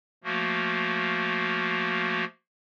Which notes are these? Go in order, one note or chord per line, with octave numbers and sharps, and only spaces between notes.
F3 A3 A#3 F#4